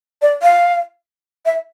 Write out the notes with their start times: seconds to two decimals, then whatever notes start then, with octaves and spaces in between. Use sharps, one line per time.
0.22 D5
0.43 F5
1.46 E5